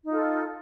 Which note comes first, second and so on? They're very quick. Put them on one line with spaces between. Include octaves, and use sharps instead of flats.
D#4 F4 A4